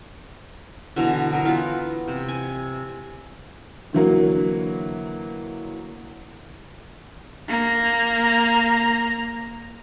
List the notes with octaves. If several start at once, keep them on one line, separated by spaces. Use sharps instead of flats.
B2 D3 E3 A#5
F#3 A#4
E3 B3 F4 B4
C3
G#5
D3 E3 F#3 A#3
A#3 A#5